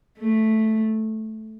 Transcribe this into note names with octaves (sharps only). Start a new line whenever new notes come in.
A3